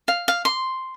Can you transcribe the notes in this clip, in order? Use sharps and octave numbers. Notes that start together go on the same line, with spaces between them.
F5
F5
C6